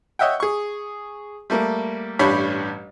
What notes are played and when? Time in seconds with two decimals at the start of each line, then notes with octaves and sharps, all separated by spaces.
0.19 C#5 D#5 E5 F#5 G5
0.40 G#4 C#6
1.50 G3 A3 A#3
2.19 A1 G2 G3 D4 C#5 B5